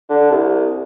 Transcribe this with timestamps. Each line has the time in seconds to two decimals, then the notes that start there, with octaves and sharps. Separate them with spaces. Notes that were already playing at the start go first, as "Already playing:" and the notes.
0.09 D3
0.30 C2